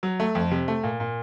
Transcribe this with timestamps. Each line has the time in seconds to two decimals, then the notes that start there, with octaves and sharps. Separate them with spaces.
0.03 F#3
0.20 A3
0.35 F2
0.51 C3
0.68 A3
0.84 A#2
1.00 A#2